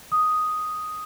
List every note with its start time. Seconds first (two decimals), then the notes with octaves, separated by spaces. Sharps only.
0.12 D#6